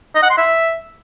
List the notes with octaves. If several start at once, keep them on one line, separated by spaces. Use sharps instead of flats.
D#5
F#5
C6
E5